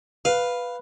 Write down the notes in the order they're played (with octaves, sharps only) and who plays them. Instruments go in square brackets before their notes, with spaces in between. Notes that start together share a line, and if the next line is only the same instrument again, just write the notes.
[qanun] B4 [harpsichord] F5